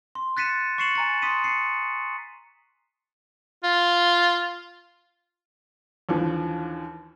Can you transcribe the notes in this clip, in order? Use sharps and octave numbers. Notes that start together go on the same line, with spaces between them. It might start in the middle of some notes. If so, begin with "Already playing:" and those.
C6
F#6 A6 B6 C#7 D#7 E7
C#6 A6 C7 C#7 E7 F#7
G#5 A#5 A6
C6 D#6 B6 C#7 D#7
C7 C#7
F4
D#2 D3 E3 F3